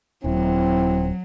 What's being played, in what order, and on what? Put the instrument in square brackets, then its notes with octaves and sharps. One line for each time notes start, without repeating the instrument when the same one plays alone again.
[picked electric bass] D#1 [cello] F#3 [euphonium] C4 [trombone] E4